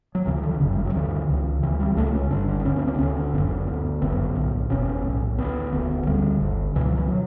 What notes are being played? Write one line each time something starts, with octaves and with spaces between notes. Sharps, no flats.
F#3
D2 C#3 E3
E3
D3
G1 F#2 C#3
G3
F#3
D2 D3 E3
C#2 C#3
D2 C#3 E3
G3
C#2 C#3 A3
C#4
G1 G2 D3 D4
D4
D4
D2 C#3 C#4
B3
C#4
D4
D2 D3 C#4
D4
G1 F#2 D3 B3
D2 D3
G1 F#2 D3 B3
B1 A2
F#1 E2 B2 C#4
B1 A2
D2 D3 B3
E1 D2 D3
D2 D3 G3
G1 G2 D3
C#2 B2 E3
F#3
E3
F#3